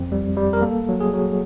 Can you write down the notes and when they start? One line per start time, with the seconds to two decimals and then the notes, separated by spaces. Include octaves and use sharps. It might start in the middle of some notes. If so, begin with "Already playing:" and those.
Already playing: F2 C4
0.12 G3
0.37 G3
0.53 A#4
0.62 A#3 A4
0.89 F#3
1.00 G#4
1.14 F#3